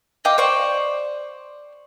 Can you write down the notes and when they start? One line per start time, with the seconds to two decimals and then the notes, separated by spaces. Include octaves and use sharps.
0.25 D#5 F5 G5 D6
0.38 C5 D5 C#6